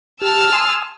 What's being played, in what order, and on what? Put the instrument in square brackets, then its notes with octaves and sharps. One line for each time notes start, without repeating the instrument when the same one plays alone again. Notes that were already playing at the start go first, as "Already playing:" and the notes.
[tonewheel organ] G4 [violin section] A5 E6 F6
[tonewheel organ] G#5 C6 D#6